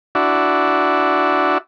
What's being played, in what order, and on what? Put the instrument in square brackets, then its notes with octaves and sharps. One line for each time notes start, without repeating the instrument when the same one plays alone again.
[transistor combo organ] D4 E4 F#4